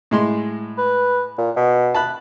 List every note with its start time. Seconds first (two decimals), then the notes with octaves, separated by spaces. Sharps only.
0.11 A2 G#3 C6
0.78 B4
1.38 A#2
1.56 B2
1.94 A5 B5 F#6